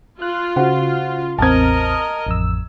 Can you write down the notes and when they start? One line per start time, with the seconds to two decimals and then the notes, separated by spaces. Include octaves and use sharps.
0.22 F4 F#6
0.56 C#3 F#4 C5 F#5
1.39 A1 E2 C4 A#4 D#5 A5 G#6
2.26 A1 F2 E6